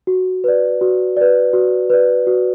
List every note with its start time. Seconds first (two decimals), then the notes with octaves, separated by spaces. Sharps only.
0.07 F#4
0.44 B4 D5
0.81 F#4
1.17 B4 D5
1.53 F#4
1.90 B4 D5
2.27 F#4